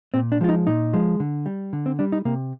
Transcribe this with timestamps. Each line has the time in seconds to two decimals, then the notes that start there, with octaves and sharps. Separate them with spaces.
0.14 A#2 C4
0.32 D4
0.41 F3 G#3 F4
0.49 D#4
0.67 A#2 D#4
0.93 F3 G#3
1.20 D3
1.46 G3
1.73 D3
1.86 C4
1.99 G3 D4
2.12 D#4
2.25 C3 A#3